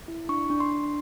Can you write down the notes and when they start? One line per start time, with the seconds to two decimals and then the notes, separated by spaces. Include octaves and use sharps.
0.08 E4
0.29 D4 C#6
0.50 D4
0.60 C6
0.72 D4